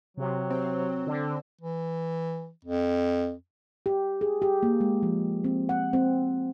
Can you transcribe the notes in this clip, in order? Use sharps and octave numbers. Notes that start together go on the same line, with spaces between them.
C3 F#3
C4
D3
E3
F2
G4
G#4
G4
A#3
G#3
F3
C4
F#5
C4